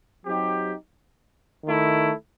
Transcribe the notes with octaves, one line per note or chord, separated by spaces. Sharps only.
F#3 C4 D#4 G4
D#3 A3 E4